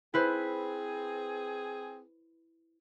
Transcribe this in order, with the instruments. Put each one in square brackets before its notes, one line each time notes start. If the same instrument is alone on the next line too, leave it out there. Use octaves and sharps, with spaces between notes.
[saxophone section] C4 G#4 [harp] E4 B4 C5